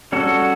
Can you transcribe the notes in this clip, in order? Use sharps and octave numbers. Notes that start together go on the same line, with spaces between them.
G3 C#4 F#4 A4